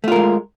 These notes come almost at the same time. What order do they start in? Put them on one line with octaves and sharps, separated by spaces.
A3 F4 A#4 G#3